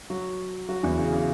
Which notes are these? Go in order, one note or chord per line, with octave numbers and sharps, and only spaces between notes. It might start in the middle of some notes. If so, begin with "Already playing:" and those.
F#3 F#4
F#3 F#4
E2 E3
C#3
C#3